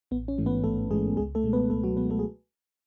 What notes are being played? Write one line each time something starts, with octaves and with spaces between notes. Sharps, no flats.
A1 B3
C#4
G#2 E3 A3
B3 B4
A1 A3 A4
G#2 E3 G#3 A3 G#4
C#2 G#3 G#4
A3 A4
B2 G#3
B3 B4
C#2 A3 A4
F#3 F#4
B2 G#3 B3 B4
A3 A4
G#4